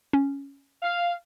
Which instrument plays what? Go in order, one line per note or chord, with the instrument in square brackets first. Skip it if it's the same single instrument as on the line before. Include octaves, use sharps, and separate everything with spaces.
[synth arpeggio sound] C#4
[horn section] F5